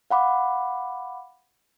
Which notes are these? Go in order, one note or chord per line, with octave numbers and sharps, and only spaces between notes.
F5 F#5 B5 D6